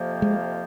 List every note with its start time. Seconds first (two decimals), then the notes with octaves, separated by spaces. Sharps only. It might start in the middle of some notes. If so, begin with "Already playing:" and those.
Already playing: F2 C3 F3 A#3
0.22 G#3